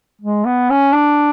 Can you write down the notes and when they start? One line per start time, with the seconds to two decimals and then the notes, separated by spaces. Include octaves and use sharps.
0.21 G#3
0.45 B3
0.70 C#4
0.93 D4